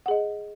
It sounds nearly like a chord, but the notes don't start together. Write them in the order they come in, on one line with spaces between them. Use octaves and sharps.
F#5 G#4 D#5